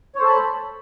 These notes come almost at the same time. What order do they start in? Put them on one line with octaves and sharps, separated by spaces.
C#5 C5 A4 A5 B5